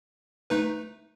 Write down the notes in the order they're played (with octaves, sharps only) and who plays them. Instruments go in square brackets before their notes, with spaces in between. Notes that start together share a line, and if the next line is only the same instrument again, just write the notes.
[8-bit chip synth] A3 D#4 B4